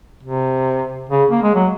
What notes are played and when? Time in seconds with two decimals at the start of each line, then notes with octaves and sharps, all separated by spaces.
0.23 C3
1.10 C#3
1.31 A#3
1.43 G#3
1.55 F#3